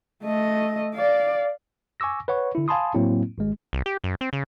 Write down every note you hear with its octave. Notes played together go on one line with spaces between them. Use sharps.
A3 D#5
D5 F5
G#5 C#6 D6 E6 A#6
B4 C#5 F#5 C#6
D3 E4
F5 G#5 A5 B5 C6 D#6
A2 F#3 A#3 C4 E4
G#1 G#3
C2
G4
F#2
C4
C#3